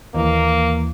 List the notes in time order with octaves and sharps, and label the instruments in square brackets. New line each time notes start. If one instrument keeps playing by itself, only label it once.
[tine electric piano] D#2 E3 [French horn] A#3